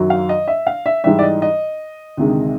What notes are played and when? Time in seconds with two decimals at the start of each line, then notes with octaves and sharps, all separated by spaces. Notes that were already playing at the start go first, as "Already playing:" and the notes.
Already playing: F#2 D#3 F#3
0.10 F5
0.29 D#5
0.48 E5
0.67 F5
0.86 E5
1.04 G#2 E3 G3 E5
1.19 D5
1.23 D#5
1.42 D#5
2.17 D2 C3 D#3 G#3